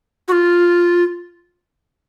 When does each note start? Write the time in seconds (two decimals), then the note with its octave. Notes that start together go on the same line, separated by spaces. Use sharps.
0.28 F#4
0.32 F4